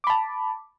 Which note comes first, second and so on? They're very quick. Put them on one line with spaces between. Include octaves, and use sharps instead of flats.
D6 B5 A5